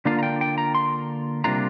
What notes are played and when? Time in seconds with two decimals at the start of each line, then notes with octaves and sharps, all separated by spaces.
0.05 D3 A#3 D4 F4 F5
0.19 A#5
0.23 G5
0.41 G5
0.58 A#5
0.75 C6
1.44 C3 G3 A#3 D4 F4 A#5